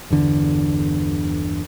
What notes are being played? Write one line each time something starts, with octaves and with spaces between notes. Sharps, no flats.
G1 E2 D3